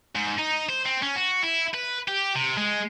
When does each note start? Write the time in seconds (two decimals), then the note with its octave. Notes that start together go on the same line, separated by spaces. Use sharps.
0.16 G#2
0.39 D#4
0.69 C5
0.86 C4
1.03 C#4
1.16 F#4
1.44 E4
1.74 B4
2.08 G4
2.35 C3
2.57 G#3